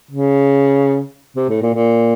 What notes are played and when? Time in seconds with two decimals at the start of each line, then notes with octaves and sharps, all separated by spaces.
0.11 C#3
1.36 C3
1.49 A2
1.62 A#2
1.74 A#2